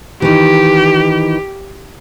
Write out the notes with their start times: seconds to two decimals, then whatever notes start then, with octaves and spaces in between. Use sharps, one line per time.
0.22 D#3 E3 G4